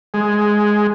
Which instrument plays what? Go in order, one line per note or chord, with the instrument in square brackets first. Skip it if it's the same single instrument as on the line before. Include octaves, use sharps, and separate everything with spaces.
[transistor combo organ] G#3